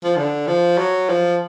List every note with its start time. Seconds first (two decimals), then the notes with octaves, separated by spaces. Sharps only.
0.04 F3
0.17 D3
0.47 F3
0.78 F#3
1.09 F3